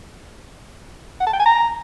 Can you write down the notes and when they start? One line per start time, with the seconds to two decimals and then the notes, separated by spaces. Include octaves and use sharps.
1.21 F#5
1.27 A5
1.33 G5
1.39 G#5
1.46 A#5